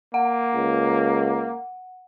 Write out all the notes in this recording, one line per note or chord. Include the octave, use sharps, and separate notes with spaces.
A#3 F#5
C#2